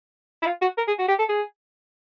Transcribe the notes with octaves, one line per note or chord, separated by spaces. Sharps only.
E4
F4
F#4
A#4
G#4
F#4
G4
A4
G#4